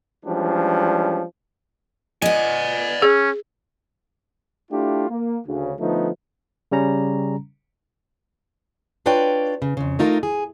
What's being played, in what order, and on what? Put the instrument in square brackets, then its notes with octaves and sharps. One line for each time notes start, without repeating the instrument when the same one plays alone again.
[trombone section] E3 F3 G3 G#3 C#4 D4
[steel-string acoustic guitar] B3 D#5 [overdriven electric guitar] D5 G#5
[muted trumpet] C#4 [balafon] G#4
[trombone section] A3 D4 E4 F4 G4
A#3
D2 C#3
D3 F3 A3 B3 D#4
[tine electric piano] C#3 G3 C#4 A#5
[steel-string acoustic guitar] D4 F4 B4 C#5 D5 G5
C#3
F2 C#3
A3 D#4 F4 A#4
G#4